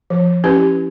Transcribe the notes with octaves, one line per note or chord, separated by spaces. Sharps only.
F3
C#4 E4 G4 B4